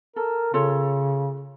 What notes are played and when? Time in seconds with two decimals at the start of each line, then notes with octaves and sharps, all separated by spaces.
0.16 A4 A#4
0.54 C#3 F4 A4 C#5